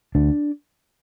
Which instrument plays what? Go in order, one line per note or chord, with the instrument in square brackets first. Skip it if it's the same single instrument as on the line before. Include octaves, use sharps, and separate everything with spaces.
[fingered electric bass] D2 D4